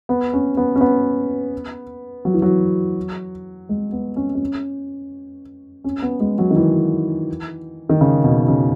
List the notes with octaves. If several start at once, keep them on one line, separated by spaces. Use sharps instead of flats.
B3
C#4
B3
C#4
B3
F#3
E3
F#3
G#3
B3
C#4
C#4
C#4
B3
G#3
F#3
D#3
E3
D#3
C#3
B2
C#3